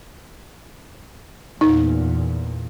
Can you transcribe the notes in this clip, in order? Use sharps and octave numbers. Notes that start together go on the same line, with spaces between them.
E2 A#2 D#4